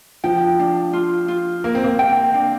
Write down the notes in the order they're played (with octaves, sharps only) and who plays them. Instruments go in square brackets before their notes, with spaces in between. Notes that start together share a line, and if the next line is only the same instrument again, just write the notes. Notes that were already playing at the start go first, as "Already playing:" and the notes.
[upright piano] F3 [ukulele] G5
[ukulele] D4
F4
F4
[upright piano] A#3 [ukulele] A#4
[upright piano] C4
A#3
[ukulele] G5
D4